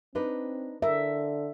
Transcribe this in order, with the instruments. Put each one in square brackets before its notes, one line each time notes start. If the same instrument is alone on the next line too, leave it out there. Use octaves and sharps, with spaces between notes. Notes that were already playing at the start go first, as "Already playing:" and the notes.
[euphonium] C4 [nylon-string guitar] D4 D#4 B4
[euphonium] D3 [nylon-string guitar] A#4 [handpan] E5